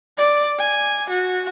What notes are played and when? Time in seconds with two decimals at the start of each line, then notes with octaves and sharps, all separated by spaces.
0.18 D5
0.59 G#5
1.09 F#4